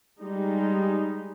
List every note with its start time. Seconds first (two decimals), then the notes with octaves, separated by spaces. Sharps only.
0.20 G3 G#3 D#4